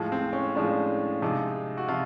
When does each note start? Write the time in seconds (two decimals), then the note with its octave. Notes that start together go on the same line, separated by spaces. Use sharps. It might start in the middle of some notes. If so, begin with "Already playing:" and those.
Already playing: A2 F3 G#3
0.12 C4
0.33 C#4
0.55 A2 F3 G#3 D4
1.22 C3 F3 G#3 D#4
1.77 F#4
1.88 C3 F3 F4